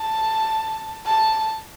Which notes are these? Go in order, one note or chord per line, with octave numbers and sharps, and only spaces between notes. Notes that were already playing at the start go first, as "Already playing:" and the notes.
Already playing: A5
A5